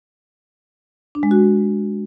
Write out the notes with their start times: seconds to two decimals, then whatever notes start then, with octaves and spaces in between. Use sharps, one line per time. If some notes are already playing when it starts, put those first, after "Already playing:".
1.15 D4
1.23 G#3
1.31 F#4